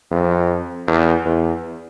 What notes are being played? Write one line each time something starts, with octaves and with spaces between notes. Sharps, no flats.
F2
E2
E2